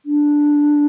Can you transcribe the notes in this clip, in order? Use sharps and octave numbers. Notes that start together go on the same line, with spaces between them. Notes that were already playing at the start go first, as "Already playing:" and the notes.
D4